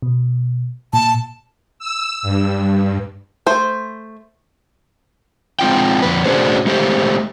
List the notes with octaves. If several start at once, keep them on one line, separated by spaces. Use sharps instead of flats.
B2
A#2 A5
E6
G2
A3 C5
G#3 C4 F4 G5
F2 B4
A3 C#4 D4 F#4 G#4 C5
G#3 A3 G4 C5